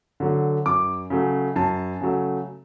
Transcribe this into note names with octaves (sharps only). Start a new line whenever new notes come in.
D3 F#3 A3
F#2 D6
C#3 F#3 A3
F#2 A5
C#3 F#3 A3